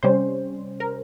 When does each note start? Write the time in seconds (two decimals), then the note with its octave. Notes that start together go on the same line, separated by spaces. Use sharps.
0.03 C3 G3 C#4 C5
0.80 A#4